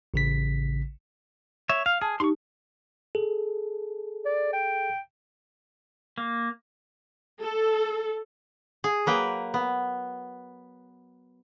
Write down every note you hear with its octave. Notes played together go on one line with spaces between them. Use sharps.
A1 C#3 B6
C#5 E5
F5 F6
G#4 A5
D#4 G4 C6 C#6
G#4 A4
D5
G5
A#3
A4
G#4
F#3 A#3 B4 G5
B3